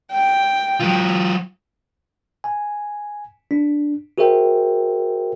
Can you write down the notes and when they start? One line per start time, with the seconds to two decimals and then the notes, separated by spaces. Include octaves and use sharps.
0.12 G5
0.80 F#3 F4
2.44 G#5
3.51 D4
4.18 F#4 G#4 A#4 C5 E5 G5